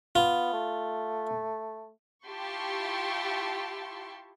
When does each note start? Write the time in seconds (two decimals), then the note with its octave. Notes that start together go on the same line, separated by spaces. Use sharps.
0.15 B3 F4
0.53 A3
2.26 E4 F4 G4 A5 C6 C#6